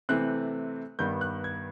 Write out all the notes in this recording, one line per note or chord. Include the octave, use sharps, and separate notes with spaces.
C3 E3 A3 C4 F#6
G2 D#3 G3 B3 G6
F#6
G#6